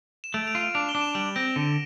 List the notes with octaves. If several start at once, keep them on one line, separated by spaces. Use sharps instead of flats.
E7
A3 D7 F7
D7 F7
F4
D7 F7
D4 D7 F7
E7 G7
D4
E7 G7
G3 D7 F7
C4 A#6 D7
D3